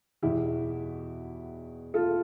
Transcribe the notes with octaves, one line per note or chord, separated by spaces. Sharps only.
E2 B2 E4 G4
F4 A4